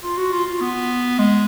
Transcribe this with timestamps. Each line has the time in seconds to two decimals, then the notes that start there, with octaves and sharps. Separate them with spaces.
0.03 F4
0.17 F#4
0.32 F4
0.47 F4
0.61 B3
1.19 G#3